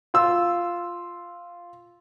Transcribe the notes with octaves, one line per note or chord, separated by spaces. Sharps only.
F4 E6